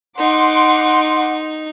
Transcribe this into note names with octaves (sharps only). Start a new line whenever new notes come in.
D#4 F#5 C6 D6